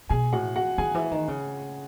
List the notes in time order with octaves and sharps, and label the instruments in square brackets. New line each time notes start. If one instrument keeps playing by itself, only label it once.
[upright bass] B2 [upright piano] G#4 G#5
[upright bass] A2 [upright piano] F#4 F#5
[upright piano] F#4 F#5
[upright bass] D#3 [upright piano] G#4 G#5
[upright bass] E3
D#3
C#3